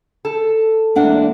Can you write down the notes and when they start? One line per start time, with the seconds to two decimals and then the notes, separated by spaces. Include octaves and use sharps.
0.25 A4
0.96 E2 G#3 A#3 D4 F#5